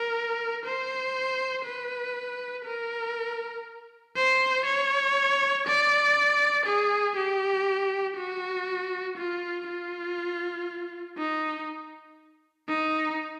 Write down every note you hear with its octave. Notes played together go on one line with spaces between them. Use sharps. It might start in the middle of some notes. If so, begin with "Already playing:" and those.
Already playing: A#4
C5
B4
A#4
C5
C#5
D5
G#4
G4
F#4
F4
F4
D#4
D#4